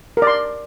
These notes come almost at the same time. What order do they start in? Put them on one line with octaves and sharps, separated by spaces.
A#4 D5 C6